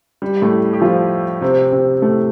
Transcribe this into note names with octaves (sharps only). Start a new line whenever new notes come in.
G3
A2 A3
G4
F3 F4
C3 C4
C3 C4
A2 A3